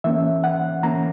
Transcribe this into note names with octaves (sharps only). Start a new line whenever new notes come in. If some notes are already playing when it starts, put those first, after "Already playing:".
E3 A#3 C#4 E5
F#5
E3 A#3 C#4 A#5